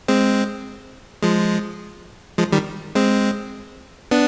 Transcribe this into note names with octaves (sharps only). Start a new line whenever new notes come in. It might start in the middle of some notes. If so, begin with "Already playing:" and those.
G#3 C4
F3 G#3
F3 G#3
D#3 G3
G#3 C4
B3 D4